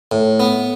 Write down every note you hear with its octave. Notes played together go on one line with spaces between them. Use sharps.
A2
B3